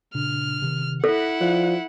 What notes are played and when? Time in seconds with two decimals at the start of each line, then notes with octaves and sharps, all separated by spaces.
0.15 A#2 C#3 D4 F6
0.62 C3 D#3
1.04 E4 A4 F#5 F#6 A#6 B6
1.41 F3 D5 F#6